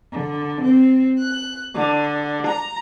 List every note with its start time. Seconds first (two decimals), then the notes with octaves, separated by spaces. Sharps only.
0.12 D3
0.62 C4
1.19 F#6
1.74 D3
2.47 A#5